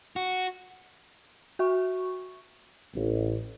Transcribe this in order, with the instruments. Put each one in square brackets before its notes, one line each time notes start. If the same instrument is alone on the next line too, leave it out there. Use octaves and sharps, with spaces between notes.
[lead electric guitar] F#4
[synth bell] F#4 E5 C#6
[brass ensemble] A1